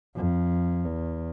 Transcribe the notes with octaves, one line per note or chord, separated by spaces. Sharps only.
F2
E2